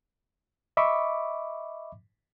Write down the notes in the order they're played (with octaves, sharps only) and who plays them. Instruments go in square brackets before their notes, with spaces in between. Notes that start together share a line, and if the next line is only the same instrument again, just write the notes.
[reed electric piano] D#5 E5 B5 C#6 D6